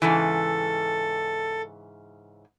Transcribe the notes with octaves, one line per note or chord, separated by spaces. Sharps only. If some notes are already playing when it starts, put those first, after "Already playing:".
G#2 C#3 E3 A4